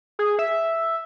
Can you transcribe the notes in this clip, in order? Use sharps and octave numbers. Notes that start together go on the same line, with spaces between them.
G#4
E5